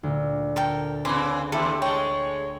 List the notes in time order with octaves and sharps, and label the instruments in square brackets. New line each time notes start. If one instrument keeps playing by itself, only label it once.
[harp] D2 A#2
[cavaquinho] A4 A#4 G5
[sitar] C#3 E3 C4 [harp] G#5 B5 C6 [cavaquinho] D6
[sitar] D#2 [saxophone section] E4 G4 [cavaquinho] A4
[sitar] G#3 A4 [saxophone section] C#5 [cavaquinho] G5